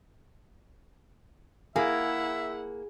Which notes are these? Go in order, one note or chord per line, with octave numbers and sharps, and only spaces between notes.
A#3 E4 G#4 E5 F#5